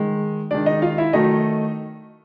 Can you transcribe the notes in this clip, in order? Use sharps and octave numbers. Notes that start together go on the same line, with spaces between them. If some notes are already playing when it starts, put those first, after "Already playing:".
Already playing: D#3 G#3
D#3 G#3 D4 D5
D#4 D#5
F4 F5
E4 E5
D#3 F#3 A3 D#4 D#5